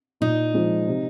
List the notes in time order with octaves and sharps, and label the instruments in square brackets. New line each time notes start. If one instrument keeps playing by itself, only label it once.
[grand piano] A#2 [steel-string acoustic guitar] D#4
[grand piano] F3 G#3
C3